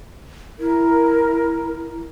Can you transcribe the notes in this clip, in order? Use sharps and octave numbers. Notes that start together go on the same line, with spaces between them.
E4 A#4